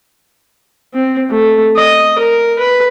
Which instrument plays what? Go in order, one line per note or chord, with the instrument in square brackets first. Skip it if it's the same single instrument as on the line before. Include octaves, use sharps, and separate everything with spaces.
[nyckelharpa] C4
A3
D#5
A#4
B4